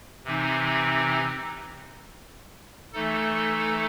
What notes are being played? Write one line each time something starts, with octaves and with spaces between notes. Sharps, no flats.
C3 E3 C4 D#4
E3 A3 D#4 A4